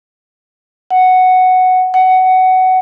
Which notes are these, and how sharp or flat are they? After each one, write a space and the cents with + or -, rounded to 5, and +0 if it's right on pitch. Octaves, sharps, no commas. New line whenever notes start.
F#5 +0
F#5 +15